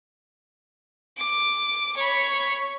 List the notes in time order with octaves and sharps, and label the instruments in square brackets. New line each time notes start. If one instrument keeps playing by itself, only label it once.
[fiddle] D6
C#5 B5